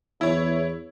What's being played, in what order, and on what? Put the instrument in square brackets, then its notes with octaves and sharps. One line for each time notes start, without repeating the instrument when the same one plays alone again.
[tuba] E2 [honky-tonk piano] E4 C#5